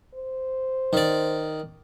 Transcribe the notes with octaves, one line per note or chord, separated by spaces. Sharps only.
C5
D#3 D5